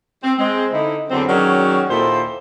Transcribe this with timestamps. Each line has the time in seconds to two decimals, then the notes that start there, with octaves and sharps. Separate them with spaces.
0.23 C4
0.39 G#3 C4
0.73 D3 D#4 E4
1.10 E2 D3 F#3 C4
1.29 D#3 F#3 C#4 F#4 G#4 D5
1.91 D#2 A#2 E4 A4 C5